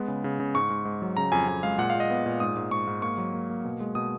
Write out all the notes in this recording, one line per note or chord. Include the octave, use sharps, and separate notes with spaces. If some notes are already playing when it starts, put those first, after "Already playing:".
Already playing: G#3 B3
C#3
C#3
C#3
G#2 C#6
G#2
G#2
F#3
C#3 A#5
F2 G#5
F2 G#5
G#3 F5
A#2 F#5
F5
A#2
D#5
B3
A#2
G#2 D#6
G#2
G#2 C#6
G#2
A#3 C#6
F#3
A#3
A#3
B2
G#3
B2 D#6